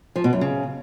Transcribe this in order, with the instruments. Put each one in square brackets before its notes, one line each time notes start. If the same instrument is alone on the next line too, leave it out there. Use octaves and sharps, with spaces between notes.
[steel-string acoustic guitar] F3
B2
F#2
C#3